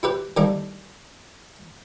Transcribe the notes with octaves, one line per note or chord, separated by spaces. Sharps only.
E4 G4 B4
D#3 E3 G3 A3 A#3